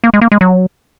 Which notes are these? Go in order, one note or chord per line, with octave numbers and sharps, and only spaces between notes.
A#3
G#3
A#3
G#3
F#3